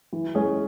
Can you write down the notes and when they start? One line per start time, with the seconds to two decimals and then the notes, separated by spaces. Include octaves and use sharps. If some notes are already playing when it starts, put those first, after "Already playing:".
0.13 E3
0.35 G#3 C#4 G#4